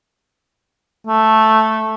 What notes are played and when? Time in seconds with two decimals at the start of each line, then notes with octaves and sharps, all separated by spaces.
1.07 A3